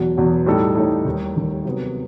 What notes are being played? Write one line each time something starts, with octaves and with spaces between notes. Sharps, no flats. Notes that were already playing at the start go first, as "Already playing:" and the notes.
Already playing: E2 B2 F#3
E2 B2 F#3
A2 G3 D#4 A4
A2 G3 D#4 A4
D#2 D#3 G3
D#2 D#3 G3
C3 F#3 B3